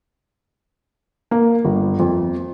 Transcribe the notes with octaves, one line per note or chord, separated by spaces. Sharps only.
A#3
G1
F2